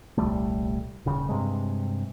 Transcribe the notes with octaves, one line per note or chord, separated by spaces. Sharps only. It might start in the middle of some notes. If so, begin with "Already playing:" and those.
D#1 C2 G3 A3
D#1 C#3
G2 C3 G#3